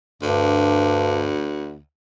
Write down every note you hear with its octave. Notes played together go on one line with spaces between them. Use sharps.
D2 G2